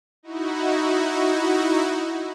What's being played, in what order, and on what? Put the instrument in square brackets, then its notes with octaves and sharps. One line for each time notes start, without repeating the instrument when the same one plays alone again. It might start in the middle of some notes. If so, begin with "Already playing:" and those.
[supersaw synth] D#4 E4 F#4